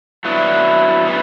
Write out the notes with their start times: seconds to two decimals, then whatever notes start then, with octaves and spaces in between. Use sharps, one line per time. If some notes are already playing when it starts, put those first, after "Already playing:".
0.25 F#3 B3 D4 E4
1.05 C#3 E3 B3